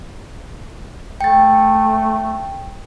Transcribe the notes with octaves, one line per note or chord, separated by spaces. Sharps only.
A3 G5 A6